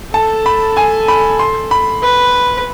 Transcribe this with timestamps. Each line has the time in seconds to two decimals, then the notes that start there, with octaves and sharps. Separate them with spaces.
0.13 A4 A5
0.46 B5
0.77 G#5
1.08 B5
1.39 C6
1.71 B5
2.02 B4